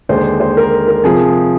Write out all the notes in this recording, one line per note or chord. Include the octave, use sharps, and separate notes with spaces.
D#2 D3 G#3 C5
C5
A#4
A#4
C3 F3 G#4